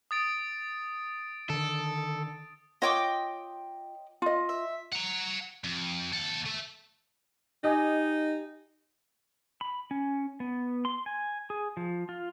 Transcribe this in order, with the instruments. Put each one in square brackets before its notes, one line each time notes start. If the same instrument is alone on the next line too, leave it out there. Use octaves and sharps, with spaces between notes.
[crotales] D#6 A6 D7
[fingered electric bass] D3 D#3 [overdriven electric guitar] A4
[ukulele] F4 C#5 [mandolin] D#5 G5 D6
[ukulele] F4 D#5
[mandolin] E5
[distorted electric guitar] F#5 A#5
F2
D#2 A4
A3 E5
[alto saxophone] D#4 [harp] G4 D#5 G#5
[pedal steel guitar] B5
C#4
B3
C6
G#5
G#4
F3
F4